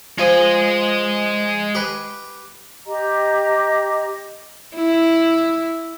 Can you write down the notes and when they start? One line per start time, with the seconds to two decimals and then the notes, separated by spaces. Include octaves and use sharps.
0.18 F3 G#3 F4 G#5
1.75 G4 B4
2.86 G4 D#5 A#5
4.76 E4